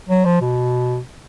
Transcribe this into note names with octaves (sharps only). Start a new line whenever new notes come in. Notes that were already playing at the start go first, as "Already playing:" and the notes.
F#3
F3
B2